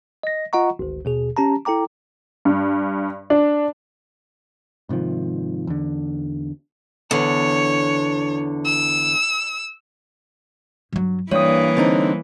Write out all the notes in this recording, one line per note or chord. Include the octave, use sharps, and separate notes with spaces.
D#5 A#6
F4 D#5 F#5 A#5 C#6
G#1 D2
D#2 B2 G#4
C#4 G4 A5 A#5
E4 A4 G5 A#5 D6
G2
D4
G#2 C3 D#3 F3
E2 D3
E2 D3 C#5
E6
G2 F#3
G2 E3 G3 A#3 C#5 D#6
D3 C4 D#4